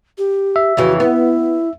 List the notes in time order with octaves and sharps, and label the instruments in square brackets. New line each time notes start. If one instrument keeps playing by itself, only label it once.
[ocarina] G4
[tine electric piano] E5
[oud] F2 C#3 E3 [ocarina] F#4
[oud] B3 [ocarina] E4